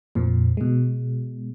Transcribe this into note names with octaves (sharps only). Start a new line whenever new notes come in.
F2 A#2 F3
B2 G#3